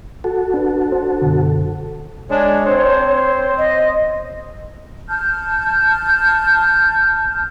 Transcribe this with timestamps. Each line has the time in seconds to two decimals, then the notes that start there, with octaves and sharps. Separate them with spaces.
0.24 F#4 A4
0.54 D4 B4
0.92 D4 C5
1.22 F#2 B2 D3
2.30 G#3 D4 C#5
2.66 C4 C5
3.58 D#5
5.09 A5 F6 G6